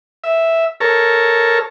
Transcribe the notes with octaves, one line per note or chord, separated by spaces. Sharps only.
E5
A4 A#4 C#5